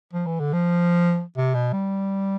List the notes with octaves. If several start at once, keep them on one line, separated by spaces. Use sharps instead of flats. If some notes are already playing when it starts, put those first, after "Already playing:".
F3
E3
D3
F3
C3
B2
G3